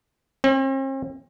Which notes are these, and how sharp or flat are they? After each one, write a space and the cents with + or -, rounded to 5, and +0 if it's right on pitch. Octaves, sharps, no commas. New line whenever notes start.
C4 +45